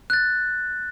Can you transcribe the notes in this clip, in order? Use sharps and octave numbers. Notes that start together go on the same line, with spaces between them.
F#6 A6